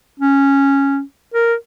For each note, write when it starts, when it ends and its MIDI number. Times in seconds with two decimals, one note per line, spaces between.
0.20 1.01 61
1.34 1.54 70